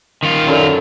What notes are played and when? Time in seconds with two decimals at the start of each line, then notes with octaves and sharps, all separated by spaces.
0.23 D#3 F4
0.47 F#2 D3